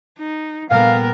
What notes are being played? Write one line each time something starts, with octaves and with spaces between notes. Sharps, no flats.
D#4
A#2 G3 B3 A#4 F5